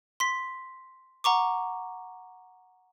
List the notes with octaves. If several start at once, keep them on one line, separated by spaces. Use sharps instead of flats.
C6 B6
F#5 A#5 C#6 D6